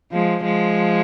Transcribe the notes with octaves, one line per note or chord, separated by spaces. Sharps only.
F3 G#3
F3 G#3